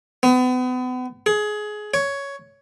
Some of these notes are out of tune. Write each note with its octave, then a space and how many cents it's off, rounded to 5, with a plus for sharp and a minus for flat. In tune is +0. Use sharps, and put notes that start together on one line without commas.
B3 +35
G#4 +20
C#5 +10